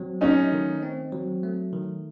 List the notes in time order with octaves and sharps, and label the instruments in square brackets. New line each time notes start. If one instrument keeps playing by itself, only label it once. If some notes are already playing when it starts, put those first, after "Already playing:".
Already playing: [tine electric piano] F#3 C4
[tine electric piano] A3 [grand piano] C#4 D#4
[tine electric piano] D#3
C4
F#3
A3
D#3